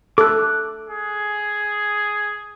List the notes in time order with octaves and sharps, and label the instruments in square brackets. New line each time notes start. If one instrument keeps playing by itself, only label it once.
[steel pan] A4 [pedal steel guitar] D6 F#6
[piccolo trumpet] G#4